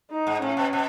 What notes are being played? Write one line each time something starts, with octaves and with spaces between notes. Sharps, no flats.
D#4
G#2
A2 C#4
B2
B2